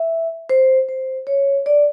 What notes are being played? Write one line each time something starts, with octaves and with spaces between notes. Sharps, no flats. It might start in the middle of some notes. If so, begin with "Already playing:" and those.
Already playing: E5
C5
C5
C#5
D5